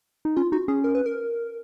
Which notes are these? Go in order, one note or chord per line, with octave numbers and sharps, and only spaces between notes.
D#4
C#4 F4
D#4 F#4
C#4 G#4
A#4
B4
A#4